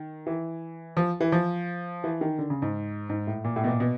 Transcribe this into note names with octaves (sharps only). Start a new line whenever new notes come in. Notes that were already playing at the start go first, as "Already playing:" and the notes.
Already playing: D#3
E3
F3
E3
F3
E3
D#3
D3
C#3
G#2
G#2
A2
A#2
A2
B2
A#2
B2